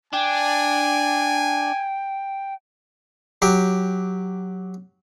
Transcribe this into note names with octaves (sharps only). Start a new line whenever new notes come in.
D4 G5 G#5
F#3 G4